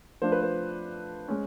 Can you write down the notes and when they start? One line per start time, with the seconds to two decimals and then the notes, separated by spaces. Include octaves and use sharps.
0.22 F3 A3 D4 C5
0.32 B4
0.43 C5
1.28 G#3 C#4